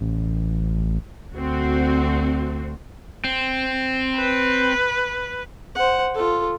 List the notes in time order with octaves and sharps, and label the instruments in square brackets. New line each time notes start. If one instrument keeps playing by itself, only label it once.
[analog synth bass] A1
[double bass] D2 [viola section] C4 F#4
[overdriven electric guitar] C4
[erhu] B4
[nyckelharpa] C5 F#5
F4 A4